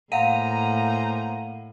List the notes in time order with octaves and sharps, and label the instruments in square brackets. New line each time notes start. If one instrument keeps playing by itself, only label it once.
[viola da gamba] A2 A#3 [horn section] C5 G#5 A#5 [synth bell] F5 F#5 D#7